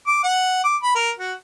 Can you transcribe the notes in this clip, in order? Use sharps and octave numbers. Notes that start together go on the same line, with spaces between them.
D6
F#5
D6
B5
A#4
F#4